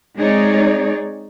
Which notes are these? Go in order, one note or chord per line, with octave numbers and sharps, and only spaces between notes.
G#3 C4 D#4 G#4 C#5 D5